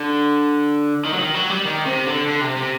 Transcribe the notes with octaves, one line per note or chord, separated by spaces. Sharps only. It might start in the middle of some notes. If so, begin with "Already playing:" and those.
Already playing: D3
D#3
F#3
D#3
F#3
G3
D#3
C3
D3
D3
C3
C3